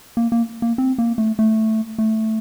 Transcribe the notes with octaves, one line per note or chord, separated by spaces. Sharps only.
A#3
A#3
A#3
C4
A#3
A3
A3
A3